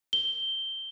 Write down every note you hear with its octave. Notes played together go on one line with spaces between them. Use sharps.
G7